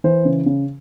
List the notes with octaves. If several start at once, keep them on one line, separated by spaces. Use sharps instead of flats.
E3 C5
C#3
C#3